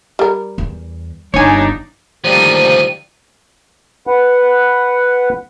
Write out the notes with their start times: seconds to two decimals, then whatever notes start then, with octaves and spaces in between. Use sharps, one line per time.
0.19 G3 A#4
0.58 E2
1.34 G1 D4 D#4 C#5 G#5
2.24 D2 D#3 F3 G3 A#3 C5 D#7
4.07 B4 F#5